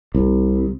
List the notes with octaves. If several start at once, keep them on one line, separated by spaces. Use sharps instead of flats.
C2